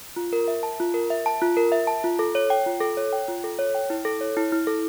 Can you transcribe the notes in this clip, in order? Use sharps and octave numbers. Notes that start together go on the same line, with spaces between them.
F4
A#4
E5
A5
F4
A#4
E5
A5
F4
A#4
E5
A5
F4
A4
C#5
G5
F4
A4
C#5
G5
F4
A4
C#5
G5
E4
A4
C#5
E4
E4
A4